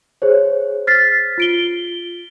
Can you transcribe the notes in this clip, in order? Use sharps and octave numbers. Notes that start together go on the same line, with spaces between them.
G#4 C5 C#5
F6 A6 B6 C7
F4 D7 G7